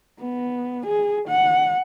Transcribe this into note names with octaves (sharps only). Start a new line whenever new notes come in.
B3
G#4
F#5